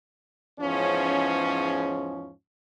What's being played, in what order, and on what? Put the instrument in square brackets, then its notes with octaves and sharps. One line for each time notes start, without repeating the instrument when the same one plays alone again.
[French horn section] E2 G#2 F3 C#4